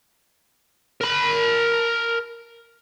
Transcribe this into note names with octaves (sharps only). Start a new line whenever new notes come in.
A#4 B5